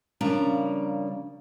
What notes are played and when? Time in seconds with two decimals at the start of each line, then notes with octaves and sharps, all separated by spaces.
0.21 C#3 F3 G3 A#3 D4 A#5